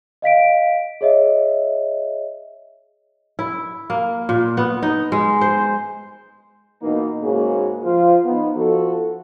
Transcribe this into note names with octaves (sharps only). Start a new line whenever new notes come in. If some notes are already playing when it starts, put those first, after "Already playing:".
D#5 F5 B6 D7
G#4 C#5 D#5 E5
E4
A#3
A#2
B3
D#4
G#3
C5
B2 E3 A#3 D#4
G#2 C#3 A#3 F#4 G#4
F3 F4 C5
B3 D#4
F3 F#4 A4